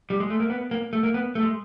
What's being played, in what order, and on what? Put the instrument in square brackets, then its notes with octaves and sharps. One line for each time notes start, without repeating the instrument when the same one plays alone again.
[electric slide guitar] G3
G#3
A3
A#3
B3
A#3
A3
A#3
B3
A3
G#3